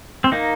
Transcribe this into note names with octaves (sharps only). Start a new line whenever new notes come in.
C4
A#3 D#4